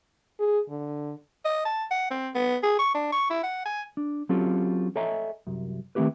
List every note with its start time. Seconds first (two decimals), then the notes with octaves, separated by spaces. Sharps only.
0.40 G#4
0.70 D3
1.45 D#5
1.65 A5
1.91 F#5
2.11 C4
2.35 B3
2.63 G#4
2.79 C#6
2.95 D4
3.12 C#6
3.30 E4
3.44 F#5
3.66 G#5
3.97 D4
4.29 F#3 C4 C#4 F4 G4 A4
4.96 A4 C#5 D#5 E5 G#5 A#5
5.47 C2 F#2
5.95 D#3 A3 C4 E4 G4 B4